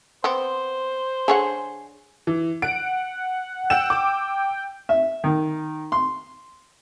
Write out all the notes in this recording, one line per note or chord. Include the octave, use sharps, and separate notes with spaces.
B3 C4 C5
D3 G#4 C#5 F#5
E3
F#5 D7
F#5 G5 E6 E7
D6
E5
D#3
C6